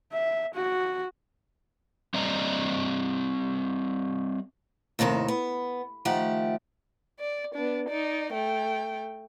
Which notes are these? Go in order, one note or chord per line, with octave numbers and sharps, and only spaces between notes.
E5
F#4
G3 C4 D5 D#5 A#5
D#2 A2 C3 D#3 A4
B3
D#3 F3 A3 G4 F#5
D5
B3 D4
D#4 D5
A3 G5